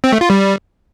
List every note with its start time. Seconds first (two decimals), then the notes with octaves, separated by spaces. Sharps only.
0.04 C4
0.12 A3
0.21 F4
0.30 G3